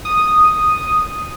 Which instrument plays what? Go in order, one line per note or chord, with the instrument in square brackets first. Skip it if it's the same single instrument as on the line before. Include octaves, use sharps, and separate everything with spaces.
[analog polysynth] D#6